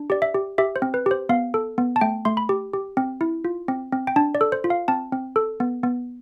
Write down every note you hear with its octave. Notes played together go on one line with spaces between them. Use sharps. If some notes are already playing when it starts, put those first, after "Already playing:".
Already playing: D4
G4 D5
E5
G4
G4 E5
C5
C4
B4
G4 C5
B3 F5
A4
B3
A5
A3 G5
A3 C6
B5
G4
G4
C4
E4
F4
C4
C4
G5
D4 A5
D5
A4
C5
F4
F5
C4 A5
C4
A4
B3
B3